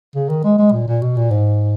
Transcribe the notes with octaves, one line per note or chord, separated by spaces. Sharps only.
C#3
D#3
G#3
G#3
A#2
A#2
B2
A#2
G#2